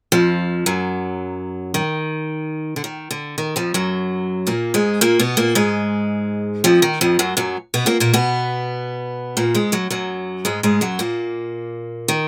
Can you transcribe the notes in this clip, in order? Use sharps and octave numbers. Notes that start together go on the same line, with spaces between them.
F2 F3
F#2 F#3
D#3
D3
D#3
D3
D#3
F2 F3
F#2 F#3
A#2 A#3
G#2 G#3
A#2 A#3
B2 B3
A#2 A#3
G#2 G#3
F2 F3
D#3
F2 F3
F#2 F#3
F#2 F#3
B2 B3
A#2 A#3
A#2 A#3
B2 B3
A#2 A#3
G#2 G#3
F#2 F#3
F#2 F#3
G#2 G#3
G#2 G#3
F#2 F#3
A#2 A#3
D#3